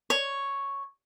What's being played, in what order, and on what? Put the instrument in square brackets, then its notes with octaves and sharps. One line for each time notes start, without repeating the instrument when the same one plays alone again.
[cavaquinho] C#5